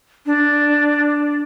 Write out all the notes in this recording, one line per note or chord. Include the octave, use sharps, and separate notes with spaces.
D4